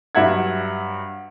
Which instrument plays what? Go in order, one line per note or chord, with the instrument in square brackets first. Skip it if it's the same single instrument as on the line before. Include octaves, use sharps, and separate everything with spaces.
[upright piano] G2 F#3 E5 F#5 G#6